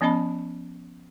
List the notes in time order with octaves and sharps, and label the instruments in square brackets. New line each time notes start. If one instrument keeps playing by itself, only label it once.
[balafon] F3 B3 C#4 D#5 A5 B5